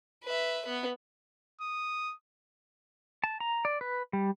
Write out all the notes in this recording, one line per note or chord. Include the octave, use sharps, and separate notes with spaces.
B4 E5
B3 B4
D#6
A5
A#5
D5
B4
G3